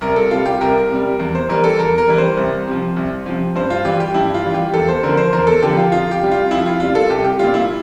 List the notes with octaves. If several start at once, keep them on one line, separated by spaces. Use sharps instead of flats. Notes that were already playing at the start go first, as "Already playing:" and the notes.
C2 A#4
A4
C3 G3 F4
G4
C2 A#4
C3 G3
E2
C5
E3 G3 A#4
A4
E2 A#4
A#4
E3 G3
C5
C2
C3 F3
C2
C3 F3
G2 C5
F4
E3 G3 G4
G4
G2 E4
F4
E3 G3
G4
E2 A4
C5
D3 F3 A#4
C5
E2 A#4
A4
D3 F3 G4
F4
F2 F4
G4
C3 G3
F4
F2 E4
F4
C3 G3 F4
A4
C2 G4
G4
A#2 G3 F4
E4